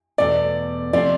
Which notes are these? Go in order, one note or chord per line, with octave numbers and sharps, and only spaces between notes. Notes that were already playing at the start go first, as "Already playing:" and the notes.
E2 B2 A3 D5
C3 F3 A3 C4 F4 D5